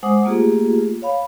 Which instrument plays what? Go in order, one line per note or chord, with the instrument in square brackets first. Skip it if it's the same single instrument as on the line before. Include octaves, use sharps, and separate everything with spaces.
[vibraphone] G#3 C5 F#5 D6 D#6
A3 A#3 F4 G4 G#4
C#5 F5 B5